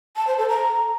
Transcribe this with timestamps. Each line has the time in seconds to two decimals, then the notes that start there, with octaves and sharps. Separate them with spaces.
0.16 A5
0.27 C5
0.38 A4
0.49 A#5